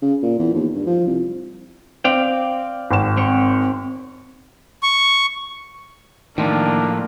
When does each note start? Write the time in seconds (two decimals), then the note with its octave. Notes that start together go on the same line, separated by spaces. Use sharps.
0.02 C#3
0.22 A#2
0.39 E2
0.53 D#2
0.74 G2
0.86 F3
1.07 C2
2.04 C4 D5 F5 G5
2.91 G#1 E7
3.17 C4 C#5
4.83 C#6
6.38 A2 D#3 F3 A#3 D4